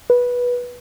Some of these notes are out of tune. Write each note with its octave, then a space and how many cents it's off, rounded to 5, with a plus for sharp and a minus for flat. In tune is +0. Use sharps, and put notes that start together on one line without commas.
B4 -15